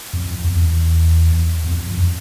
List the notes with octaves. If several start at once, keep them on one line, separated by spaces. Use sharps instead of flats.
F2
E2
E2
F2
F2